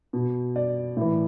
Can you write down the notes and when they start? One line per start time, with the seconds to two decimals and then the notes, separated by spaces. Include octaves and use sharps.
0.13 B2
0.56 D5
0.97 A2 E3